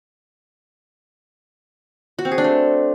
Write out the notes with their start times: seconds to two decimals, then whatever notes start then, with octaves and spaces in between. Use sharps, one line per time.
2.19 F#4
2.25 C4
2.31 G#4
2.38 D4
2.44 A3